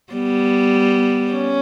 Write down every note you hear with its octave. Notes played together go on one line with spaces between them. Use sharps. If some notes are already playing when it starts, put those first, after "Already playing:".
G3 B3
C#4